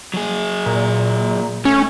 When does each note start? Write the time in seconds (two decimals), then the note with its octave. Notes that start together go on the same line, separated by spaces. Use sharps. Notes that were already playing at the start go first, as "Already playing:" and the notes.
0.14 F#3 G#4
0.66 A#2
1.65 A3 C#4